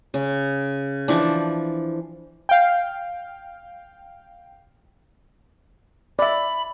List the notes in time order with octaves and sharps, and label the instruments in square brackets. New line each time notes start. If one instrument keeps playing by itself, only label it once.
[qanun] C#3
E3 F3 D4
[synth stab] F5 G5
[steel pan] D5 E5 [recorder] B5